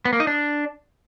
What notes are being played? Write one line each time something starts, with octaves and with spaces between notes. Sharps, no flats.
B3
A#3
D#4
D4